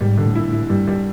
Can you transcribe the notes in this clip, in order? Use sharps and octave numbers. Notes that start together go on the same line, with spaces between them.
G#2 G3
D3
A2
E4
A2
E4
G2 G3
G3